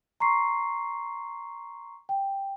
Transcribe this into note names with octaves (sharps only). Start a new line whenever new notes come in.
A#5 C6 C#6 C7
G5